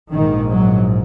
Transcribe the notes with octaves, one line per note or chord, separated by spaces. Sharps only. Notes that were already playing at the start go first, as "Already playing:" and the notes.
A#1 G#2 D#3
F#3